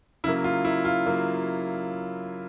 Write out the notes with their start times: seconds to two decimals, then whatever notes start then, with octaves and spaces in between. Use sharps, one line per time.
0.24 C#3 E4
0.27 F#3 A#3
0.44 F4
0.65 E4
0.85 F4
1.06 C#3 F#3 A#3